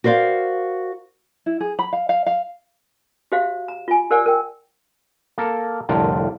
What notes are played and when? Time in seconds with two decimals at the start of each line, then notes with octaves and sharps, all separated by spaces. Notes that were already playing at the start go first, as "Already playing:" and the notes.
0.04 F#4 A#4 C5 D5 F5
1.46 E4
1.60 G#4
1.79 B5
1.93 F5
2.09 F5
2.26 F5
3.32 F#4 G4 C5 E5 F5
3.68 A#5
3.88 F4 G#5
4.10 G4 A#4 C5 D5 F#5 G#5
4.26 A#4 G5
5.38 A#3 A4 A#4
5.89 C2 F2 A2 D3 F4 A#4